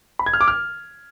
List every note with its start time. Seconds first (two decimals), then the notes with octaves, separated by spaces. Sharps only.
0.19 B5
0.26 G#6
0.33 F6
0.41 D6
0.48 F6